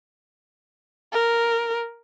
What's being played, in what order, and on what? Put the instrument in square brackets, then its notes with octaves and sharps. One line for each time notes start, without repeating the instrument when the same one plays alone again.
[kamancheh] A#4